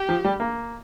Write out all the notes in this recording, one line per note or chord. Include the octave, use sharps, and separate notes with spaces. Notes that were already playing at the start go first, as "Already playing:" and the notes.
Already playing: G4
F3
G3
A#3